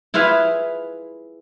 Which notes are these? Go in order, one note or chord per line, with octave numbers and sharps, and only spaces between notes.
E4 F4 G#4 B4 F5